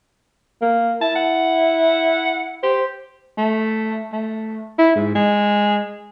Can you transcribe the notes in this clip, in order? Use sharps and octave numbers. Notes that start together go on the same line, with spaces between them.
A#3
E4 A5
F#5
G4 C5
A3
A3
E4
G#2
G#3